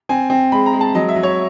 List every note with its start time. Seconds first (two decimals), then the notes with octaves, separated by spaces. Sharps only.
0.09 C4 G#5
0.30 C4
0.52 G#3 B5
0.66 A#5
0.73 G#3
0.81 A5
0.95 F#3 D#5
1.09 E5
1.16 F#3
1.23 C#5